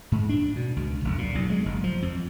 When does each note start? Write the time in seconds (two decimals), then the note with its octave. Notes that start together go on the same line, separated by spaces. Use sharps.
0.12 G#2
0.29 D4
0.56 B2
0.76 C#2
1.04 F1
1.18 A#2
1.35 B1
1.50 G#3
1.66 F#1
1.84 F3
2.02 F2